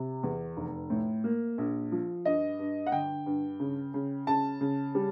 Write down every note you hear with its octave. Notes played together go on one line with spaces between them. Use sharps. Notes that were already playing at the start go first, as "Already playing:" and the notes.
Already playing: C3
E2
F1
A2
A#3
A#1
F3
G2 D#5
G2
F#5
D3 G5
G2
C#3
C#3
C#3 A5
C#3
G3